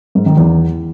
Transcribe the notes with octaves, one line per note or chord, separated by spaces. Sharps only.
G#2
D#3
E2